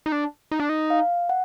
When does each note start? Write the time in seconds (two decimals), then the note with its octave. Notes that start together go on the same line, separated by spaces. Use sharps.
0.06 D#4
0.12 D4
0.51 D#4
0.60 D4
0.69 D#4
0.90 F5
1.29 F#5